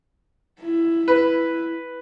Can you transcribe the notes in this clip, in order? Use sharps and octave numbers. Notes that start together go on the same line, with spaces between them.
E4
B4